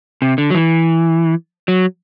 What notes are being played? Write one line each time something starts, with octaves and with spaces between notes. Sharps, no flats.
C3
D3
F#3
E3
F#3